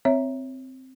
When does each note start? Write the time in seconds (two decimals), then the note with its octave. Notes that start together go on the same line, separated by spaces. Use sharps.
0.05 C4 C#5 E5